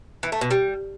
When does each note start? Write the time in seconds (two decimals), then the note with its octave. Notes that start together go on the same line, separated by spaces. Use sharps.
0.23 E3
0.32 A3
0.41 B2
0.51 G3